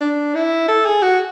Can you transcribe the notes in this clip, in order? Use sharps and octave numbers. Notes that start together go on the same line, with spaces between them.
D4
E4
A4
G#4
F#4